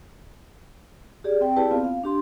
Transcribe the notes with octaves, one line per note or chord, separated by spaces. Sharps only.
G4 G#4 D5
C4 G5
E4 G4 G#4 B4 D5 A5
B3 C4 F4 F5
F5
D4 G4 C6